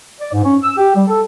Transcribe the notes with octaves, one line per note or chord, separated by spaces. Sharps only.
D5
G#2
C#4
E6
G4
G3
A4